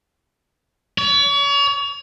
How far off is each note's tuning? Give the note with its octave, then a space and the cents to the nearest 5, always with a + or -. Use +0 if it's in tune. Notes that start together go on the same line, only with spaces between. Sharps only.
C#5 +35